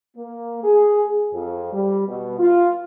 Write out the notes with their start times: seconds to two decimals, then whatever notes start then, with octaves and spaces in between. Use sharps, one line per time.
0.17 A#3
0.63 G#4
1.33 F2
1.73 G3
2.08 B2
2.39 F4